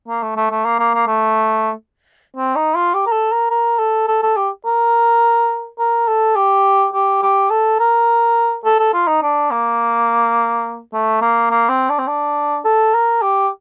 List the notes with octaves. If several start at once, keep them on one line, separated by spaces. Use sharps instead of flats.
A#3
A3
A3
A3
A#3
A#3
A#3
A3
C4
D#4
F4
G4
A#4
A4
A#4
A#4
A4
A4
A4
G4
A#4
A#4
A4
G4
G4
G4
A4
A#4
A4
A4
F4
D#4
D4
A#3
A3
A#3
A#3
C4
D4
C4
D4
A4
A#4
G4